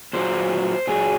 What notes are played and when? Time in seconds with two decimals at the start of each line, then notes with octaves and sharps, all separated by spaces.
0.13 A#2 F#3 C5
0.87 A#2 F#3 G#4